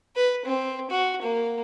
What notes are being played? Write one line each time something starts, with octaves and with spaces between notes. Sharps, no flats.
B4
C4
F#4
A#3